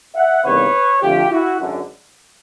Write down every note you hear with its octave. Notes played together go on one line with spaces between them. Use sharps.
E5 F#5
E2 C3 D#3 G3 A#3 B4 C#5
F2 D3 F3 A3 F4 G4
E4 F#4
G#1 F#2 D3